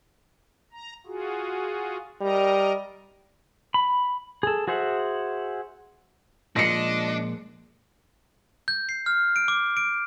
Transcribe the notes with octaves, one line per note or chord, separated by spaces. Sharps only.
A#5
F4 F#4 G#4
G3 A#4 D#5 A#5
B5
G#4 A4
F#4 G#4 C5 E5 F#5
A#2 F3 G#3 D4 D#5 A#6 C7 C#7
G6
C7
F6
D7
D6
D7